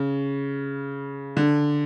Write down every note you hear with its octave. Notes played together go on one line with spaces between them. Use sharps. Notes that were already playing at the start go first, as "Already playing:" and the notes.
Already playing: C#3
D3